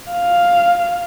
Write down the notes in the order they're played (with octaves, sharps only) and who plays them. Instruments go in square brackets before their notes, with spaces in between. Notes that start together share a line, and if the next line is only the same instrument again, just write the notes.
[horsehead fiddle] F5